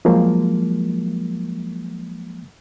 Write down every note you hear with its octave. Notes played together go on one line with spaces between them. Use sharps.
F3 F#3 G#3 A#3